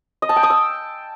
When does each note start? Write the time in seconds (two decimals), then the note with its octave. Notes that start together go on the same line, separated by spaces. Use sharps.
0.22 D#5
0.29 A5
0.36 G5
0.43 D#6
0.50 E6